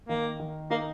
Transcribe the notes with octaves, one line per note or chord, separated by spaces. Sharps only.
D#3 A#3
D#3
A#3 D#4